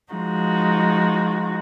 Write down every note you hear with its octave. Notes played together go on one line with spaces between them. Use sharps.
F3 G#3 D#4 F#4